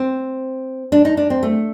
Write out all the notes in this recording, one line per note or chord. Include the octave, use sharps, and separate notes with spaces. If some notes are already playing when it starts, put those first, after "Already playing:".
Already playing: C4
D4
D#4
D4
C4
A3